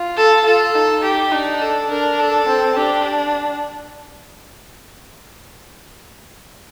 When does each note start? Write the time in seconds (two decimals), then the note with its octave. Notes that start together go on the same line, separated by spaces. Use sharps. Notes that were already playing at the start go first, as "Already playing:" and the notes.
Already playing: F4
0.17 A4
0.46 F4 A4
0.75 D#4
1.03 G4
1.32 D4 D#4
1.61 A4
1.90 D4 A#4
2.19 A4
2.48 C4
2.77 D4 G4